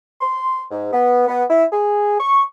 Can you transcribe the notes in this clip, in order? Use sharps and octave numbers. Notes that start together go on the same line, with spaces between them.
C6
G#2
B3
B3
E4
G#4
C#6